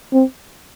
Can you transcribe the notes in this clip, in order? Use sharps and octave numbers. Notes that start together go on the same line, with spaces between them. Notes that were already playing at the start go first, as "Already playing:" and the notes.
C4